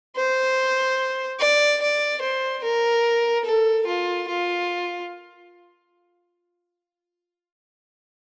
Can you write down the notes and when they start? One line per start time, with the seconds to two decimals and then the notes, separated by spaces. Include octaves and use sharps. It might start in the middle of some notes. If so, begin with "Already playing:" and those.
0.16 C5
1.40 D5
1.81 D5
2.21 C5
2.64 A#4
3.45 A4
3.87 F4
4.28 F4